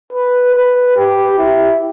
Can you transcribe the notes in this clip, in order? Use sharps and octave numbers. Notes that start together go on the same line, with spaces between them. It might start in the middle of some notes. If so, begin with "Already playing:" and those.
B4
B4
G4
E4